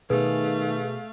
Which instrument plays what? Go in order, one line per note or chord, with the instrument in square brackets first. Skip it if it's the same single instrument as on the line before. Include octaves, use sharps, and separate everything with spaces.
[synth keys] B2 G#4 [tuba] D#3 [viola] A3 F5 [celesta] B4